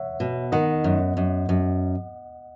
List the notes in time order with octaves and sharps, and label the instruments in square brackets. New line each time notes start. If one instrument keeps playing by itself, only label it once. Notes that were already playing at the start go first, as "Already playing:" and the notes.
Already playing: [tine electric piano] C#5 E5 F#5
[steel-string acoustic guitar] B2
[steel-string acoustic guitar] D#3 [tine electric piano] D#5 F#5
[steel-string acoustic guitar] F#2
F#2
F#2